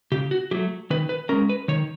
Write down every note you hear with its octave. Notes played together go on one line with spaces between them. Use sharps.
C#3 G4
F#4
F#3 A3 G4
D#3 B4
B4
G#3 C#4 A#4
B4
D#3 C#5